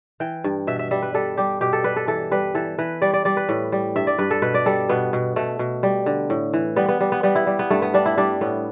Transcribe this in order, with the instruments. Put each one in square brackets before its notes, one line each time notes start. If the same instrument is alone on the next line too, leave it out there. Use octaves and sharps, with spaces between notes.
[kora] E3 G5
G2
B2 E5
E5
G3 E5
B4
G3 A4
G3 G4
B2 G4
A4
G3 B4
A4
E3 A4
G3 B4
E3 A4
E3 B4
G3 D5
D5
G3 D5
B4
A2
G3
G2 E5
D5
G2 B4
A4
B2 B4
D5
G3 A4
B2 B3
B2
B2 A3
B2
G3
D3
A2
E3
G3 B3
B3
G3
B3
G3 B3
E4
G3
B3
G2 A3
B3
G3 D4
E4
G3 D4
A2 B3